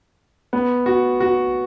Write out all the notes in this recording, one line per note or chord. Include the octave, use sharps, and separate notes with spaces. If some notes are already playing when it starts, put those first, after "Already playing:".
B3
F#4
F#4